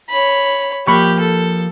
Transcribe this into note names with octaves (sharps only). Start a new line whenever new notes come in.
C#5 B5
F3 A#3 G4 B5 C#6
A4